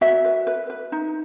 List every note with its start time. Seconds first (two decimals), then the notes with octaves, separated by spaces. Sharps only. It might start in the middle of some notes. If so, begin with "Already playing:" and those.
0.01 F#4 E5
0.25 B4
0.47 B4
0.70 B4
0.92 D#4